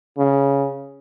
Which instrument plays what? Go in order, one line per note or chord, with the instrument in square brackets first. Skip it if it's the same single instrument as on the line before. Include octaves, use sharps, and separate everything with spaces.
[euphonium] C#3